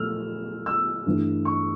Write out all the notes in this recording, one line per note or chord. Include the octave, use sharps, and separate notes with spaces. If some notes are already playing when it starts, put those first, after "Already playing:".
Already playing: A#2 F3 A3 E6 F6
E6
G2 E3 A3
C#6